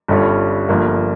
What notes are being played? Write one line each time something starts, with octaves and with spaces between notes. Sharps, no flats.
G1 G2 G3 C#4 F4
G1 G2 F3 A#3